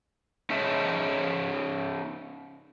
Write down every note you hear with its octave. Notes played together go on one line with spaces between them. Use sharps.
C#4 D#4 G#4 E5 A5